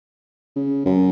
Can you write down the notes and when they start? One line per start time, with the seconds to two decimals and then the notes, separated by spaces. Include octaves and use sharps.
0.56 C#3
0.86 F#2